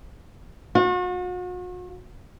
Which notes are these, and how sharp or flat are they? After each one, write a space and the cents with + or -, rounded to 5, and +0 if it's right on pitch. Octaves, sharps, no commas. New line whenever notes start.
F#4 -40